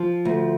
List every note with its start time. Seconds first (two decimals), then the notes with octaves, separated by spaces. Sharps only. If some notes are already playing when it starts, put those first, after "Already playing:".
Already playing: F3
0.25 D2